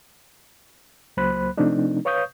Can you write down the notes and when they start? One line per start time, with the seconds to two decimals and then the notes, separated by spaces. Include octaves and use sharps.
1.17 C#2 F#3 A#3 C5 B5 F#6
1.57 C3 F3 A3 C4 D4 D#4
2.05 B4 C#5 F5 C#6 D#6 G6